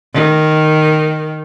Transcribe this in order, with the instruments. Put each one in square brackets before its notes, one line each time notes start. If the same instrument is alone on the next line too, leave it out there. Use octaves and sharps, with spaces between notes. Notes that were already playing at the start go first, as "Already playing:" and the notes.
[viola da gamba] D#3